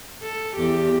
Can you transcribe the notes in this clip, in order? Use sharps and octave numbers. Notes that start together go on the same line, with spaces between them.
A4
E2 G4